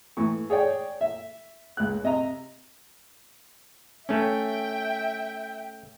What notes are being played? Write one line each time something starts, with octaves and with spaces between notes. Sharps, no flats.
A2 E3 C#6
G#4 C#5 D5 G5
E5
C#2 F#6
C3 D#5 E5 A#5
A3 C#4 E5 G5